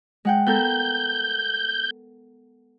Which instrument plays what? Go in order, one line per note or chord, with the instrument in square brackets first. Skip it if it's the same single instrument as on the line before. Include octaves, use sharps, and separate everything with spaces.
[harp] G#3 F#5 G5
[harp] B3 A4 A#4 [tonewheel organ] G6